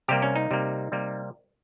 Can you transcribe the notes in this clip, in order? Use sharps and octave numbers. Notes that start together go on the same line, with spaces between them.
C3 G3 A#3 G4
C#4
D#4
C3 G3 A#3
C3 G3 A#3